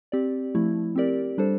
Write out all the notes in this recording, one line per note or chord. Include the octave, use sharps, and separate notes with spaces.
C4 G4 D5
F3 A3 E4
C4 G4 A#4 D5
G3 D4 A4 C5